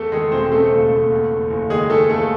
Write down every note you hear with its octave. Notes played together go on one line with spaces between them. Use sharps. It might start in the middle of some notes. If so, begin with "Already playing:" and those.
Already playing: E2 A3 A4
D#3 G#3 G#4
E1 C4 C5
C#3 A3 A4
D#2
D#2
E2
F#1
F#1
D#3 G#3 G#4
D#3 A3 A4
D#2 A3 A4